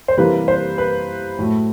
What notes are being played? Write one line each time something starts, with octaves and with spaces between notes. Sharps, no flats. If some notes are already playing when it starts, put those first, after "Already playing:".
C5
C3 E3 G3 A#3 B4
C5
B4
A2 F#3 A3